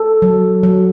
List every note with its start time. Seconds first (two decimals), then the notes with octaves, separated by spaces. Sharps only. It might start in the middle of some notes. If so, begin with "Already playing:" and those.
Already playing: A4
0.22 F#3
0.63 F#3